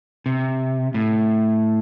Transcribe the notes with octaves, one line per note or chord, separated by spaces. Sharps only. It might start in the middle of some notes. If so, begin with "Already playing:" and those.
C3
A2